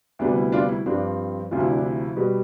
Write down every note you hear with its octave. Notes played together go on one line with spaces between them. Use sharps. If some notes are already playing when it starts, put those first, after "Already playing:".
D2 C3 G3 B3 D4
E4
D4 F4
E4
G2 F3 C4 D4
D2 C3 F3 F4
E4
D4
E4
B2 G3 B3